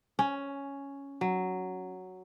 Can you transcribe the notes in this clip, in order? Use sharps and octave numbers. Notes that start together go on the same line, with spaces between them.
C#4
F#3